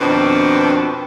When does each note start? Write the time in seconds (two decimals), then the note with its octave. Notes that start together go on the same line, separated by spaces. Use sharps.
0.01 F2 B2 D#3 C4 D4 B4